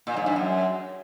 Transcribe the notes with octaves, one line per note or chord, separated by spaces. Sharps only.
A#2
G#2
G2
F#2